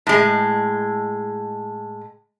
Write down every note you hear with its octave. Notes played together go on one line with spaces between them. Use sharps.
A2 G#3